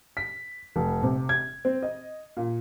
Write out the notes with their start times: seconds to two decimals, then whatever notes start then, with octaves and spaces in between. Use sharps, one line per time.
0.17 B6
0.76 F1
1.03 C3
1.29 G#6
1.65 C4
1.83 D#5
2.37 A#2